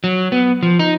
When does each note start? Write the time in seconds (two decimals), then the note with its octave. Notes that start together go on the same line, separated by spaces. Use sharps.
0.04 F#3
0.32 B3
0.63 F3
0.79 D#4